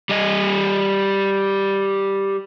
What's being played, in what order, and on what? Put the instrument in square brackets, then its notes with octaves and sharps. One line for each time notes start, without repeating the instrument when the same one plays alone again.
[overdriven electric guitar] G3 D#5